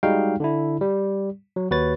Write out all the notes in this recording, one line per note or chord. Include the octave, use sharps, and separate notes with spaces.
G3 G#3 D#4 F#4 F5 G5
D3 D4 E4
G3
F#3
D#2 F#4 B4 C#5 A6